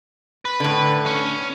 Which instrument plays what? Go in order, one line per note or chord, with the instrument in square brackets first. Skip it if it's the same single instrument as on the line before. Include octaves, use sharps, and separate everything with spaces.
[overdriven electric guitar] B4
[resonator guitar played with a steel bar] A2 D3
[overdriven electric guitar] C#4